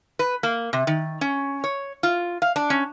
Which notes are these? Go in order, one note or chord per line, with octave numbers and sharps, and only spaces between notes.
B4
A#3
C3
D#3
C#4
C#5
F4
F5
D4
C#4